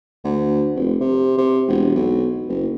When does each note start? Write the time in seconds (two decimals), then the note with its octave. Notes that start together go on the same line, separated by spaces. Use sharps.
0.24 D2
0.75 F1
1.01 C3
1.38 C3
1.68 E1
1.95 B1
2.48 F#1